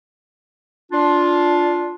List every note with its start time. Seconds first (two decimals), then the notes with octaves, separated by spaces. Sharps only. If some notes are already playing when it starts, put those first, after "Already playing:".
0.92 D4 F4